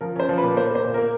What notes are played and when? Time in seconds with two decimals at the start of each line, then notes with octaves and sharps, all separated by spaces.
0.01 F3 A#4
0.16 C#4 C5
0.29 F3
0.38 B4
0.43 A#2
0.56 A#3 C5
0.71 A#3 C5
0.84 A#2
0.94 A#3 A#4